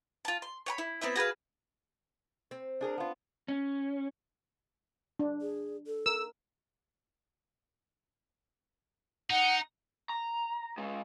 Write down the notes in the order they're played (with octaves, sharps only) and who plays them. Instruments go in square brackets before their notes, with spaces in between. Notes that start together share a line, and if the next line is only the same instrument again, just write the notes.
[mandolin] F4 A5
C6
C#5 F#5 B5
E4
B3 C4 E4 E5
F#4 G#4 B4 F5
[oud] C4
[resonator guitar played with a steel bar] D4 G#4 A#4
B3 F4
[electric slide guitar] C#4
[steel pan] D4
[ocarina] G#4
A4
[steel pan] A#4 [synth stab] E6
[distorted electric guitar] D#4 [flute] F#5
[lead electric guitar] A#5
G#3 C#4